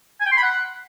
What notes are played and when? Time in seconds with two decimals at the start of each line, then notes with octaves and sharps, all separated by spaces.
0.20 G#5
0.26 G5
0.31 C6
0.37 B5
0.43 F#5